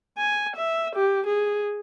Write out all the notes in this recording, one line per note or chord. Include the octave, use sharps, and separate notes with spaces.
G#5
E5
G4
G#4